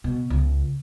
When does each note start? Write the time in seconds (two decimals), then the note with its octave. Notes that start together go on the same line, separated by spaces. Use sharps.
0.04 B2
0.30 C#2